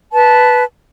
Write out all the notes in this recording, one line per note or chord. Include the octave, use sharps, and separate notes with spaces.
B4 A5